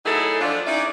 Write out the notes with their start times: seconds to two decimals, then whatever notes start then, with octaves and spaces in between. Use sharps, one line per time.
0.05 F#3 A3 D#4 E4 G#4 A4
0.41 F3 D4 F4
0.67 C#4 D#4 E4 D5